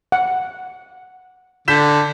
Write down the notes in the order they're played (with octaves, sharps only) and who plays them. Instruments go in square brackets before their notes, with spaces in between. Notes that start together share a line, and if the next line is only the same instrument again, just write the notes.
[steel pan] F#5
[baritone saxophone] D3 [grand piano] G6 B6 E7